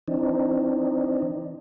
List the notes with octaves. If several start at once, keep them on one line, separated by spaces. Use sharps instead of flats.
E3 C4 D4 D#4